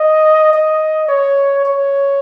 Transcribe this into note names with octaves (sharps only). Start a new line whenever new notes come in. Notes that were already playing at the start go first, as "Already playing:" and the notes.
Already playing: D#5
D#5
C#5
C#5